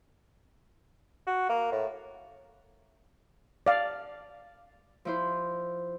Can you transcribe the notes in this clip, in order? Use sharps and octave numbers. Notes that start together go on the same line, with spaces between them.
F#4
A#3
A2
D5 F5
F3 E4 C5